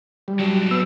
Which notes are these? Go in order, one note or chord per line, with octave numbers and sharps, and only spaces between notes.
G3
F#3 D4
B3 E6